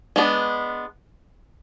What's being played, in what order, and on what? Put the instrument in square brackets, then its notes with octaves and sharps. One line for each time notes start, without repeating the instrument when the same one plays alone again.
[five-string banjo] G#3 B3 D4